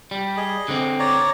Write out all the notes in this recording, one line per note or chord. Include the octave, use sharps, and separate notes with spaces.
G3
G#4 D#5
D3 C4
C#5 D5 A#5